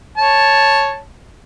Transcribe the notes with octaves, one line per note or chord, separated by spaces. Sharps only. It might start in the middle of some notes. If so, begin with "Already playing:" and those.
C#5 A5